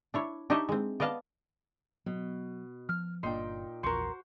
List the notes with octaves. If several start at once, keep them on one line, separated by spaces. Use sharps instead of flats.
D4 E4 C#5
D4 D#4 G4 C#5 D#5 E5
G#3 C4
B3 D5 D#5 F5 A5
B2 F#3
F3 F6
G1 A#2 D4 D#4 G5 C6
A#1 E2 F#4 A#4 C5 C6